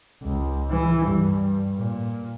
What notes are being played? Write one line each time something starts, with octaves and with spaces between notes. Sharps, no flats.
C#2
E3
G2
A#2